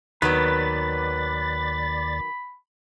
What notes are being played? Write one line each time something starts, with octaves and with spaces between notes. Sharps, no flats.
D#2 D#3 F#3 B3 B4 D5 B5 A6